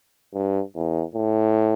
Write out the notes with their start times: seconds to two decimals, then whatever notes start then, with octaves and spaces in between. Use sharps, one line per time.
0.34 G2
0.75 E2
1.15 A2